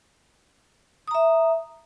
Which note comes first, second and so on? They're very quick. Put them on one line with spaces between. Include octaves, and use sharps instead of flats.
D#6 A#5 E5